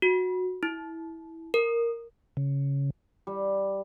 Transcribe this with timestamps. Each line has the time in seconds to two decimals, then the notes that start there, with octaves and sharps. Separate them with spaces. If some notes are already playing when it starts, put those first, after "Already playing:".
0.02 F#4
0.63 E4
1.54 A#4
2.37 C#3
3.27 G3